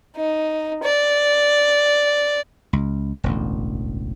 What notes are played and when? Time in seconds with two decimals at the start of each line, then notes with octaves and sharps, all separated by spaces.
0.16 D#4
0.83 D5
2.73 C#2
3.24 E1 A1 D2